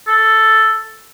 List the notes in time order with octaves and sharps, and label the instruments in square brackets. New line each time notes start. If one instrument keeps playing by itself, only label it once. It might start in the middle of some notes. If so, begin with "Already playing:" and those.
[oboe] A4